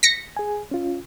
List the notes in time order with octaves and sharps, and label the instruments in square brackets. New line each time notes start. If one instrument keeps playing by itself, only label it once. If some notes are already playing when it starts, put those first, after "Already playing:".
[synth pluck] A#6 B6 C#7
[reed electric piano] G#4 G#5
C#4 F4